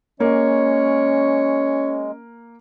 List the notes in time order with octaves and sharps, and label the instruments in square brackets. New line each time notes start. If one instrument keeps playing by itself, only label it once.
[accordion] G#3 [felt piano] A#3 [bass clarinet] C#4 [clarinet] C#5